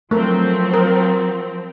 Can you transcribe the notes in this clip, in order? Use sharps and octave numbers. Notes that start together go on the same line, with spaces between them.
F3 F#3 A3 C4 A#4
A#4